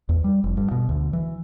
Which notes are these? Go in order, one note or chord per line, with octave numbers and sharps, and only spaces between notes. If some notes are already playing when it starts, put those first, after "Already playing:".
E2
G3
F1
G2
B2
D2
E3